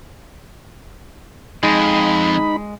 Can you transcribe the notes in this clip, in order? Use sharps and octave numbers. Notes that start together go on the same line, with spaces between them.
F2 G#3 D#4 B5